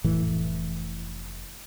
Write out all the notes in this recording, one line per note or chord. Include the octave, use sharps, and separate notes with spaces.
F1 A2 E3